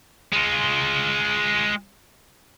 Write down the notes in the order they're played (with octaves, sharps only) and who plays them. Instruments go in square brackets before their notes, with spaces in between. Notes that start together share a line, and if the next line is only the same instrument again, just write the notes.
[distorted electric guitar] G#3 F4